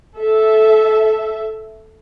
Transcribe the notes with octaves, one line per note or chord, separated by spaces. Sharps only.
A4 E5